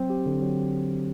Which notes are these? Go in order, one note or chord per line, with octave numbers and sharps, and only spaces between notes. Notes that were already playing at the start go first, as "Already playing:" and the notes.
Already playing: F#3 C4
G4
D3
F#3